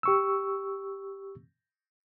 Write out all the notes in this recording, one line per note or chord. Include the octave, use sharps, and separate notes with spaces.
G4 C#6 E6